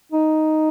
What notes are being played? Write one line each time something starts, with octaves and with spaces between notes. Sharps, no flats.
D#4